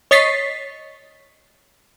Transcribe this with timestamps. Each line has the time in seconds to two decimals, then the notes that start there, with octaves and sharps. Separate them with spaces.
0.11 C#5 D#5 C#6 A6 B6 C7